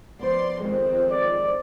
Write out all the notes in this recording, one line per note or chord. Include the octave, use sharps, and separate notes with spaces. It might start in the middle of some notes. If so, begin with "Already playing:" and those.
F3 B3 C5 D5 C6
F2 D#3 F3 G#3 C4
D5